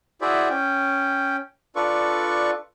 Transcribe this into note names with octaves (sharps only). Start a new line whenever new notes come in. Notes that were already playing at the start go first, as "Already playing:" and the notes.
E4 F#4 G#4 C5 D5 E5
C#4 G5
D4 F4 A4 B4 D5 C#6